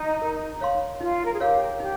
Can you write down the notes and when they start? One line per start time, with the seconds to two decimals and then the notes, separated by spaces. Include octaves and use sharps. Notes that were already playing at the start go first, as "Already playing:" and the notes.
Already playing: D#4
0.22 A#4
0.61 C#5 F5 C6
1.01 D#4 F4
1.25 A#4
1.33 G#4
1.40 G4 A#4 C#5 F5
1.80 D#4 G4